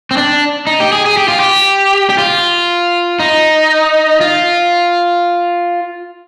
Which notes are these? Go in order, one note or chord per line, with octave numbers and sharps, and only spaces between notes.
C4
D4
D#4
G4
G#4
G#4
G4
F4
G4
G4
F4
D#4
F4